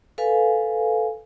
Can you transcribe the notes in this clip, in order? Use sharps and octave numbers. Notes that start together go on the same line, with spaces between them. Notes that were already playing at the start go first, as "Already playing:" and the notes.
A4 B4 F5 G#5